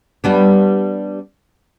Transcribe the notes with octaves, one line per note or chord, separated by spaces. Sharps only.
G3 B3 D4